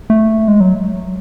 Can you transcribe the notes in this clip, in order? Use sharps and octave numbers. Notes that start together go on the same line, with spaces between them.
A3
G#3
F#3